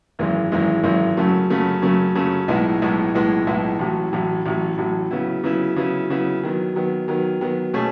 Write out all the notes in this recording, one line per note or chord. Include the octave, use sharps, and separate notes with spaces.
G#1 F#2 E3 G#3
G#1 F#2 E3 G#3
G#1 F#2 E3 G#3
F#2 C#3 F#3 A3
F#2 C#3 F#3 A3
F#2 C#3 F#3 A3
F#2 C#3 F#3 A3
B1 A2 G#3 B3 E4
B1 A2 G#3 B3 E4
B1 A2 G#3 B3 E4
B1 A2 G#3 B3 E4
A1 A2 F#3
A1 A2 F#3
A1 A2 F#3
A1 A2 F#3
C#3 F#3 B3 E4
C#3 F#3 B3 E4
C#3 F#3 B3 E4
C#3 F#3 B3 E4
D#3 F#3 B3
D#3 F#3 B3
D#3 F#3 B3
D#3 F#3 B3
B2 A3 C#4 G#4